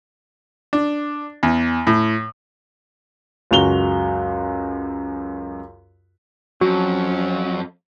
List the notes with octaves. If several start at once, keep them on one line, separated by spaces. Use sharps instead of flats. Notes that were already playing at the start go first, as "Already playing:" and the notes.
D4
E2
A2
C#2 F#2 F#4 F7 G7
F2 F#3 C#4 F#4